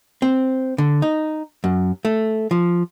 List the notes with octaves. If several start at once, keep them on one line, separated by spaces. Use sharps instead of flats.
C4
D3
D#4
F#2
A3
F3